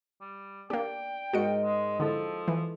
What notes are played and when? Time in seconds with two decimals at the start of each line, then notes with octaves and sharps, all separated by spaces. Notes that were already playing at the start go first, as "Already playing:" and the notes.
0.21 G3
0.70 A#3 D4 G4 G5
1.33 G#2 F#4 A#4 D#5 C#7
1.64 G#3
2.00 D3 F3 E4 A4 E5
2.48 E3